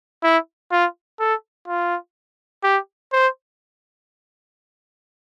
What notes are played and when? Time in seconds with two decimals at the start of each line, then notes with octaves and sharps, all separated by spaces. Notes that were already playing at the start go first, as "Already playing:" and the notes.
0.23 E4
0.71 F4
1.20 A4
1.68 F4
2.64 G4
3.13 C5